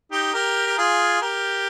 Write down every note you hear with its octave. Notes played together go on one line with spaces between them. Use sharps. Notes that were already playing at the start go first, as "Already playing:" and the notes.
D#4 G4
G4 A#4
G4
F4 G#4
G4 A#4